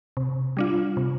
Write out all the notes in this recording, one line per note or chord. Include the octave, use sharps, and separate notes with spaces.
C3
G3 D4 F4
C3